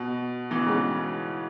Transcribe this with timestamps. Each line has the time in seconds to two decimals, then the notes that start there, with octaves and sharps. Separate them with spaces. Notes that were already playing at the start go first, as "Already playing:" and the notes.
Already playing: B2
0.51 B2 E3
0.66 G#2 C#3